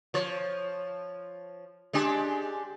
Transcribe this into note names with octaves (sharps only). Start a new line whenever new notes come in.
F3 C#5
G#3 D4 G4